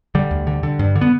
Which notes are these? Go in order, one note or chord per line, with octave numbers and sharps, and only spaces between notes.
D3 G3
D2
D3
D3
G2
D3
B3